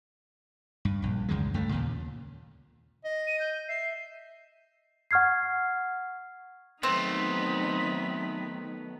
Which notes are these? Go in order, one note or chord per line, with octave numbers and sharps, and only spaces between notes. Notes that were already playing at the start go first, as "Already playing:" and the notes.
G2
A#1 G2
C#2 F#2 D#3 G#3
C#2 G2 A3
D#2 A#2 C#3
D#5
D#7
G6
E5 C7
F#5 C#6 F6 G#6 C7
D#3 F#3 A3 B3 C4 D#4 B5